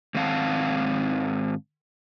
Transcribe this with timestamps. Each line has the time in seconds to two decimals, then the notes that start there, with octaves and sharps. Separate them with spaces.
0.15 G#2 D#3 C4 F5 F#5 A5